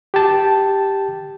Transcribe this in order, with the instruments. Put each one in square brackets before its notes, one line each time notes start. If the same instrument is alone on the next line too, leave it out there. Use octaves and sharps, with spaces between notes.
[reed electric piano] G4 G5 A5